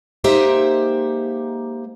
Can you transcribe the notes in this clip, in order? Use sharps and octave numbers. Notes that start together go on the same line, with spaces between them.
G#3 A#3 D#4 G4 C5 E5